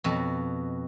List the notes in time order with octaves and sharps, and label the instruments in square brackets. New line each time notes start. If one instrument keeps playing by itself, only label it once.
[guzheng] F2 B2